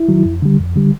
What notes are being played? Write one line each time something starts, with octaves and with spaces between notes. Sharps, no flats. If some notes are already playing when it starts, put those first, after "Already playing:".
Already playing: E4
D#3 F#3
F2
D3 G3
F2
D3 G3